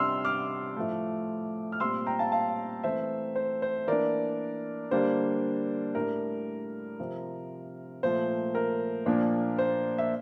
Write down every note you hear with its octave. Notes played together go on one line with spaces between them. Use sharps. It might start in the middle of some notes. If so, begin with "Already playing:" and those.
Already playing: C3 G3 D4 C6 E6 F6
D6 F6
A2 F3 A3
F6
A#2 G3 C4 C6 E6
G5 A#5
F5 A5
F5 A5
E3 A3 C4 C5 E5
C5
C5
E3 A#3 D4 A#4 D5
D3 G3 A#3 D4 C5
A2 G3 D4 A#4
C3 F3 C4
A#2 F3 A3 C5
A#4
A#2 F3 A#3 D4
C5
E5